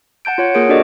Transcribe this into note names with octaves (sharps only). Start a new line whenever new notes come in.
F#5 A5 G6 D7
F4 C#5 F#5
A#3 F4 G#4 A#4 C#5 D7
D4 F#4 A4 A#4 D5 D#5